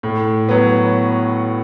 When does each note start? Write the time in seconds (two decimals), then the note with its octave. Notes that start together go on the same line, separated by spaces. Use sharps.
0.03 A2
0.49 F#3 B3